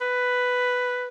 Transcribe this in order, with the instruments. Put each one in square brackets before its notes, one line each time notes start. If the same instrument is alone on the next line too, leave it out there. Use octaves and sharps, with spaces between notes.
[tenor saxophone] B4